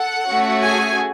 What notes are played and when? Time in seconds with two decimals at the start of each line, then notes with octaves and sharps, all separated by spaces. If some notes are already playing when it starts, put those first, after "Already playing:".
Already playing: A4 F#5
0.26 A3 C#4 F#4
0.62 G#4 G#5